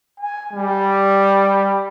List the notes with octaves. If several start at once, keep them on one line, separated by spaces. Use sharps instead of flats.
G#5
G3